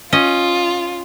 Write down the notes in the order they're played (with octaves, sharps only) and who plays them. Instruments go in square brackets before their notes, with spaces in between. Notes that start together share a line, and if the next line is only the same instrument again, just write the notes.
[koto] C#4 D#5 [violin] F4